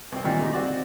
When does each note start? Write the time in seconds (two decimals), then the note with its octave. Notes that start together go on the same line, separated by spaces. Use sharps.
0.12 C2 C4
0.24 A#2 D#3 E3 G3
0.40 D3 A3 D#4 F#4 G4
0.53 C4 F#4 D5